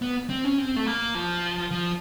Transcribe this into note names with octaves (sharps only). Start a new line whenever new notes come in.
B3
C4
C#4
C4
A3
A#3
F3
F3